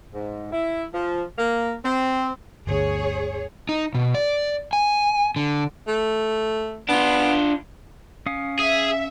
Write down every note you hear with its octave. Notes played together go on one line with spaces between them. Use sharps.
G#2
E4
F3
A#3
C4
G1 D2 G#4 C#5
D#4
B2
D5
G#5
D3
A3
B3 D4 F4
C#4 F5 D#6
G#4 E5